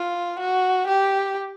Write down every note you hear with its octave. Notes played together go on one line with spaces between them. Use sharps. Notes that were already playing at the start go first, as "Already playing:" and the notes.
Already playing: F4
F#4
G4